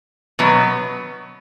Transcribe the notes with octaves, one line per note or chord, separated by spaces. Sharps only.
B2 F#3 B3